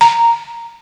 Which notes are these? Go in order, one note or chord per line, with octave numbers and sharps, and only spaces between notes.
A#5